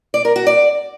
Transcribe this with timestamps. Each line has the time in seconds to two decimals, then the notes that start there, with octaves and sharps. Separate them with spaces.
0.14 D5
0.25 A#4
0.36 F#4
0.47 D5